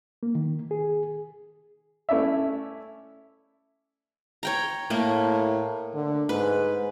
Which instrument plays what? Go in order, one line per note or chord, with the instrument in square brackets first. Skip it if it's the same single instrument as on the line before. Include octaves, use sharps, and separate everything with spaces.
[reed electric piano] A#3
D#3
G#4
[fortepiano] A3 C#4 E4 D5 E5
[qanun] C#5 G5 A#5
[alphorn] A2 [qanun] A3 A#3
[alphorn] D3
[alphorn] G#2 [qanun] B4